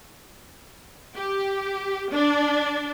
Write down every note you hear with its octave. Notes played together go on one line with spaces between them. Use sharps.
G4
D4